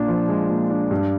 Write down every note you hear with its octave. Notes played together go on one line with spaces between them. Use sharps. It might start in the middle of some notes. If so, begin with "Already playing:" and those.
Already playing: A#2 D4
F3
G#3
A#2
D4
G2